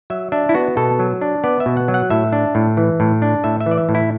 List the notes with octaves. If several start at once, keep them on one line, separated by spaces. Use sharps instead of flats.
F#3 E5
D4 E5
E4
B3 F#4
B2 A4
F#3
D4
B3 D5
E5
B2
F#5
F#3
F#5
A2 E5
D4
A2
E3
A2
D4
A2 E5
E5
E3
D5
E5
A2
E4